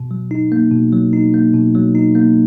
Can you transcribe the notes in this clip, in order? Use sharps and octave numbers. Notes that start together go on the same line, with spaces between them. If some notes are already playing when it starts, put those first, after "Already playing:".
Already playing: B2
F#3
D#4
A#3
B2
F#3
D#4
A#3
B2
F#3
D#4
A#3